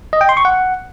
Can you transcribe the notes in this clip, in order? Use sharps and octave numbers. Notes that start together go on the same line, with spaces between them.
D#5
G5
C6
C#6
F#5